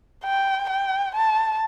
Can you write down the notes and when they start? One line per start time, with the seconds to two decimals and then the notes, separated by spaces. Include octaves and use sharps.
0.25 G5
0.70 G5
1.15 A5